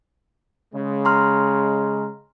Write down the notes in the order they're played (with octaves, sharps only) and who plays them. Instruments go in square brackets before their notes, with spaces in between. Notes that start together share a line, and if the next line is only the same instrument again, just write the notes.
[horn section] C#3 G#3
[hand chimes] A#5 C6 F6